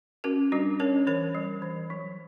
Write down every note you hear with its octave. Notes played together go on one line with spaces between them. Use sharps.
C#4 F#4 A#4
G3 D4 F#4
C#4 A#4 C#5
E3 A#4 C#5
G3
E3
F#3